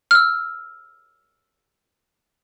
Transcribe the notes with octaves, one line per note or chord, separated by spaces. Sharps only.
E6 F6